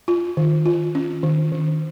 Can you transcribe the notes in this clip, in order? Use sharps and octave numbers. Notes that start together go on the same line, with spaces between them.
F4
D#3
F4
C#4
D#3
D#3